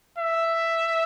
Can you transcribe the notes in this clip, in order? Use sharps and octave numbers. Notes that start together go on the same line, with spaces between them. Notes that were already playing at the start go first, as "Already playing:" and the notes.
E5